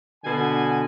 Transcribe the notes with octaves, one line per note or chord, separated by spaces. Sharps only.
B2 D3 G#5